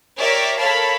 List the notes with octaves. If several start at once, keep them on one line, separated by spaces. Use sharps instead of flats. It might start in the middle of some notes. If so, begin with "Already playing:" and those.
G4 A#4 C#5 D5 E5
A4 A#4 C#5 F5 A5 B5